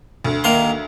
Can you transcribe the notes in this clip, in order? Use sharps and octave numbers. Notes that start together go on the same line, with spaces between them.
D2
D#3 A#3 C6